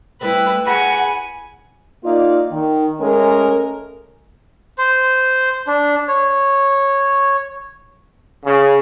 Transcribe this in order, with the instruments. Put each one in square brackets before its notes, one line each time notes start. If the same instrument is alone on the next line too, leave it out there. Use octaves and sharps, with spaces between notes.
[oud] G3 A3 C4 [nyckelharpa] E4 B4
[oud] G#3 [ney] F#5 [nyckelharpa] G#5 [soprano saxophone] B5
[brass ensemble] A#3 D#4 F4 D5 F5
D#3
G#3 A3 C#4 A4 A#4
[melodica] C5
D4
C#5
[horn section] C#3